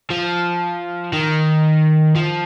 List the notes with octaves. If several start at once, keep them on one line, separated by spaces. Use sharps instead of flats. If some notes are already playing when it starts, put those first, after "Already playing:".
F3
D#3
F3